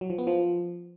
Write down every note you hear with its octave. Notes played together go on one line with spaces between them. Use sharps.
F#3
F3
B3
F3